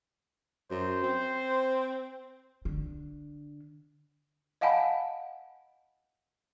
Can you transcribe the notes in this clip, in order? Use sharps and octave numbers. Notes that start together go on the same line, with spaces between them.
F#2 C5
C4
D3
D#5 F5 F#5 G#5 A5 B5